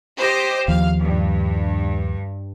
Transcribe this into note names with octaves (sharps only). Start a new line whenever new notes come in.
G4 C5 D#5
D#2 F3 F5
G2